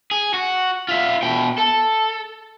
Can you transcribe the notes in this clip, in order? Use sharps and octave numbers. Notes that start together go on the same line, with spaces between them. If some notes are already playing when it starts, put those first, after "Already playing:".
G#4
F#4
F4 E5
B2 G5
A4